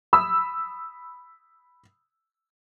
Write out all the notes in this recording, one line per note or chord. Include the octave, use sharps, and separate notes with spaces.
B5 D#6 E6